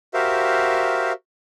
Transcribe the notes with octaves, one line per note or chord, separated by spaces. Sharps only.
F#4 G4 A#4 C5 E5 F5